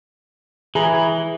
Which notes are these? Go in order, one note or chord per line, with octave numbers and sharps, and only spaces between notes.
E3 G#4 A#5